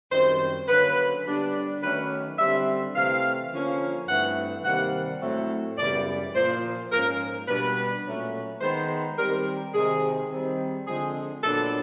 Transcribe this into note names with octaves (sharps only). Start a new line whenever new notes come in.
F#2 D#3 G3 C4 C5
D3 F#3 A#3 C#4 B4
D3 G3 B3 D4
D#3 F#3 A3 C#4 B4
D3 G3 C4 E5
C3 E3 A3 F5
D3 F3 A#3 C#4
G2 E3 A3 C4 F#5
C3 D#3 G3 A#3 F#5
A2 F#3 A3 C4
F#2 C#3 E3 G3 B3 D5
A#2 F3 A#3 C5
G#2 F3 A#3 C#4 A#4
B2 G3 B3 D4 B4
A#2 F#3 A3 C#4
D#3 G#3 B3 C5
D#3 G3 C4 A#4
C3 D#3 G#3 G#4
D#3 G3 C4
D3 F3 G#3 C4 G#4
A#2 F#3 B3 D4 A4